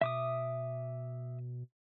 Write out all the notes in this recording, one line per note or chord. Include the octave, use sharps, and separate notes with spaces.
B2 E5 D6 D#6